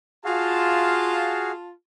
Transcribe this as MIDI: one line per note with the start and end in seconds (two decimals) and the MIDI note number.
0.25 1.71 65
0.25 1.51 66
0.25 1.51 68
0.25 1.51 77
0.25 1.71 81